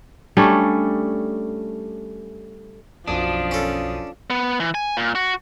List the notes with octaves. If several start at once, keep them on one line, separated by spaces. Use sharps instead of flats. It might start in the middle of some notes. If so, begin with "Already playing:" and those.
G3 A3 C#4 D4
B1 F#2 F3 D4 D#6
C#4 A4
B3
E3
G#5
A#2
F#4